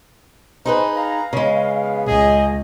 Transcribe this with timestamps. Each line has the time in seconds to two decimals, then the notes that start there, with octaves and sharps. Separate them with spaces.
0.65 D#4 G#4 B4 C5
0.96 F5 A#5
1.33 C#3 G#3 B3
2.06 C#2 G#4 D#5